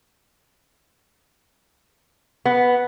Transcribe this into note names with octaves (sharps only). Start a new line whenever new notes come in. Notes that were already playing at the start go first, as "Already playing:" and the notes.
B3